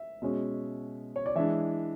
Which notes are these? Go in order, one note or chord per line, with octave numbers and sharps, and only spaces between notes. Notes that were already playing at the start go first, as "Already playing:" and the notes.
Already playing: E5
B2 G#3 C#4
C#5
D5
E3 G#3 D4 E5